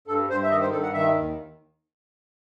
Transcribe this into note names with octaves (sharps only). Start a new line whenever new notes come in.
G2 A4
G2 C5
E5
D#3 D#5
C5
G2 A4
F#5
D#3 E5
D#2